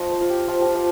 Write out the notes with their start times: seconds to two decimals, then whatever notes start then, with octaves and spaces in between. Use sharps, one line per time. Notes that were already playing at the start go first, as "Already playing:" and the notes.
Already playing: F3 D#5
0.11 C5
0.21 F4
0.30 G4
0.48 F3 F4
0.61 F4 G4
0.75 F3